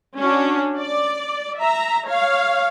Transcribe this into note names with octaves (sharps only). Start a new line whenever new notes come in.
C#4 D4 F#4
D5
E5 A#5
C#5 F5